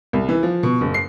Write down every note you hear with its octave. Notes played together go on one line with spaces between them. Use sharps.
C2
E3
F3
B2
F#1
C7